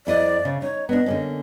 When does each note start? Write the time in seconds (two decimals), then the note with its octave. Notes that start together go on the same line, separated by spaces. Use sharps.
0.07 F2 E4 D5 D#5
0.45 C#3
0.62 D#4 C#5
0.89 B3 D4 D#5
1.06 D3 A#3 C#4